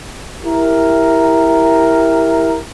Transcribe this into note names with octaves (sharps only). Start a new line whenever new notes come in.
E4 G4 A#4